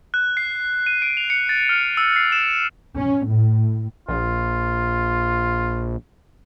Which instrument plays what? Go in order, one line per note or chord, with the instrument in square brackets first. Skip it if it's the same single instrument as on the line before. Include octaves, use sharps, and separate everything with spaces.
[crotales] F#6
C7
D#7
D7
F7
C#7
A6
F6
E6
C7
E7
[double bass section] C#4
A2
[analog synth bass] A#1 [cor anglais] F4